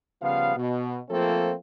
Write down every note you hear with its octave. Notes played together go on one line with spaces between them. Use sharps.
C#3 F3 G3 B3 F5
B2
F3 A3 A#3 C4 F4 A4